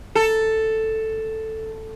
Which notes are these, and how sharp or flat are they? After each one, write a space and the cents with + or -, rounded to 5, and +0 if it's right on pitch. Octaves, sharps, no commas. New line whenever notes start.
A4 +5